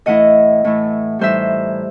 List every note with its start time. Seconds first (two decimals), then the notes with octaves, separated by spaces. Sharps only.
0.06 A2 E3 A3 E4 D#5 F#5
0.64 A2 E3 A3 E4
1.19 A2 E3 G3 D#4 C5 E5